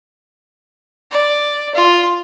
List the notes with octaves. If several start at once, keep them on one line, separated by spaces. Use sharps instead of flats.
D5
F4